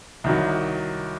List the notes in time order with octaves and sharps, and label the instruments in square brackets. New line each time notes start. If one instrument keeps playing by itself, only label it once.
[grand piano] C2 D#3 F#3